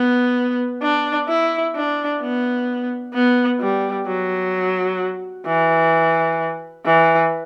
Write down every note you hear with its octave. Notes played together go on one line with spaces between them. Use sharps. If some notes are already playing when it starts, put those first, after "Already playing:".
Already playing: B3
D4
E4
D4
B3
B3
G3
F#3
E3
E3